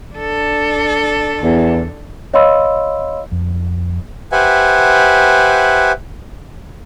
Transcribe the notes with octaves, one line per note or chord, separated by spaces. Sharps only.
D4 A4
E2
C#5 D#5 F5 B5 C6 E6
F2
G4 B4 C5 E5 F#5 G#5